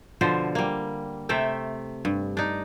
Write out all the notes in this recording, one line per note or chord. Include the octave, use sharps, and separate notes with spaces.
B2 D3 F3 C5
G3 A#3
C3 A3 E5 G5
G2
D4 D#4